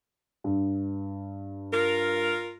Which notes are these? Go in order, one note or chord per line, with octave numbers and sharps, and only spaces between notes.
G2
F4 A#4